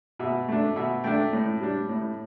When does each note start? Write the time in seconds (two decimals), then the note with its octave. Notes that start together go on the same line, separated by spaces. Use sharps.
0.19 B2 E5
0.49 A3 D4
0.76 B2 E5
1.04 A3 D4 G5
1.33 A2
1.61 G3 D4
1.89 A2